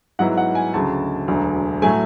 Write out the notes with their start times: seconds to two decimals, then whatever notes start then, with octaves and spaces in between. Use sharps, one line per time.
0.19 G#2 F#3 B3 E4 F#5
0.37 F#5
0.55 G#5
0.74 D2 C#3 F#3 A5
1.28 E1 D2 D3 F#3
1.82 A2 F#3 A3 G#5